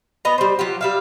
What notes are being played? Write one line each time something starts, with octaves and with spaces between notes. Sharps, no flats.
B3 D#5 A#5
G3 C5
F#3 F4 G4
G3 E5 F5